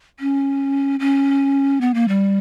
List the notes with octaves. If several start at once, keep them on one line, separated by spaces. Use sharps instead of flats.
C#4
C#4
B3
A#3
G3